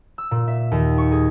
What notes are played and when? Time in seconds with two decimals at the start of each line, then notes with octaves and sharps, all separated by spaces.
0.18 E6
0.31 A#2
0.48 E5
0.72 D#2
0.98 C#6
1.12 G#4